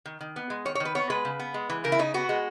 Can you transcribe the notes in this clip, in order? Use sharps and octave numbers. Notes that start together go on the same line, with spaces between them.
D#3
D#3
B3
G#3
D#3 C#5
C#5
D#3
B4
B3 C#5
G#3 B4
C#3
B3
G#3
E3
C#3 A#4
E4
C#3 D#4
B3 F#4
G#3